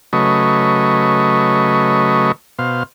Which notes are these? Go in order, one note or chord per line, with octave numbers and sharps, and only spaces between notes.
C#3 F#3 A3 B4 D#5 C#6
B2 C5 F5